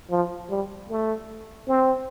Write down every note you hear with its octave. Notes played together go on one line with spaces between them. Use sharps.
F3
G3
A3
C4